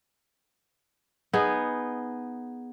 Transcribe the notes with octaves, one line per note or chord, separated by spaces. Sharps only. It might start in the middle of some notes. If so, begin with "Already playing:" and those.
B3 D#4 G#4